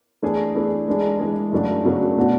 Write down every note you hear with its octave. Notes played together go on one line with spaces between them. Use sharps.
E3 A3 D4 G#4
E3 A3 D4 G#4
E3 G#3 D4 G#4
E3 G#3 D4 G#4
F#2 C#3 F#3 A3 D4
F#2 C#3 F#3 A3 D4
B2 A3 D4 F#4